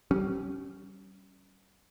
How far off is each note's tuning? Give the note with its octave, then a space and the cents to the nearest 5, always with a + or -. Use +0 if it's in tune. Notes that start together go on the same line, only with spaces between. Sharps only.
G3 -35 C#4 +0